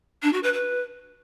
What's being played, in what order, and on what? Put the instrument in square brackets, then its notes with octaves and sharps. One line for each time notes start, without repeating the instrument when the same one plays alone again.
[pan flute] D4
F#4
B4
B4